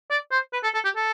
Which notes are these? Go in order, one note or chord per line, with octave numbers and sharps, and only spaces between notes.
D5
C5
B4
A4
A4
G4
A4